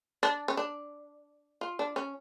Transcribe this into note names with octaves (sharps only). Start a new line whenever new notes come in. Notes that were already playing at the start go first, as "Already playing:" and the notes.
D4
C#4
D4
F4
D4
C#4